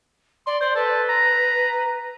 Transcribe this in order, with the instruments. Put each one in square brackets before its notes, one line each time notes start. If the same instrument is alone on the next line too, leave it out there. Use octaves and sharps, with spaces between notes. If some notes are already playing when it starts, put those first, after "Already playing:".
[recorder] D5 [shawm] C6
[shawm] C5 [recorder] D5
[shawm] A4 [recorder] B4
[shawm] A#5